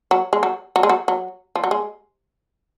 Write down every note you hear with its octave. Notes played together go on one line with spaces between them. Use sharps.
F#3
G#3
F#3
F#3
G#3
F#3
F#3
F3
F#3
G#3